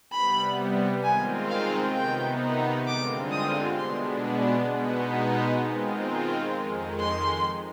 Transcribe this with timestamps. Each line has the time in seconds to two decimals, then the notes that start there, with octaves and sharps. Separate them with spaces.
0.11 C3 G3 B3 B5
1.03 D#3 G#3 C4 F4 G#5
1.50 F5
1.95 C3 D#3 B3 D#4 G5
2.87 G2 D3 G#3 C4 F4 D6
3.32 D#6
3.78 B2 G#3 B3 D4 C6
4.70 B2 G#3 B3 D#4
5.63 D#3 G#3 C4 F4
6.54 F2 D#3 G#3
7.00 C6